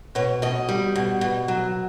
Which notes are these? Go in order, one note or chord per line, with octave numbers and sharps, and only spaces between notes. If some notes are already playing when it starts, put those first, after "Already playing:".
B2 C#5
B2 D#5
G3
B2
B2
F#3